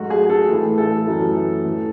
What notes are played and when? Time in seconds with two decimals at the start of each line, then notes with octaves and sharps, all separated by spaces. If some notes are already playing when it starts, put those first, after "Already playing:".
Already playing: G#2 F#3 A3 F#4
0.10 G#4
0.29 A4
0.49 A2 E3 A3
0.78 A4
1.07 F#2 E3 A3
1.64 A2 E3 A3